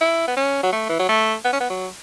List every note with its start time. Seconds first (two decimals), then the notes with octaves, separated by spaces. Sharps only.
0.01 E4
0.28 B3
0.36 C#4
0.63 F#3
0.72 A3
0.89 E3
1.00 F#3
1.09 A3
1.45 B3
1.53 C#4
1.60 B3
1.70 F#3